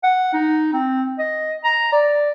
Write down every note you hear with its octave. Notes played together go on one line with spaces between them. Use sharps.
F#5
D#4
C4
D#5
A#5
D5